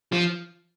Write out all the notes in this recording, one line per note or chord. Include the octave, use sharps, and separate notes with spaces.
F3